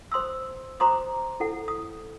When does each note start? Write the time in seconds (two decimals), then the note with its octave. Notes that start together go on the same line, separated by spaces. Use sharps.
0.12 C5 C6 D#6 E6
0.80 C5 A#5 C6 D6 D#6
1.40 E4 A4 F#5
1.68 D#6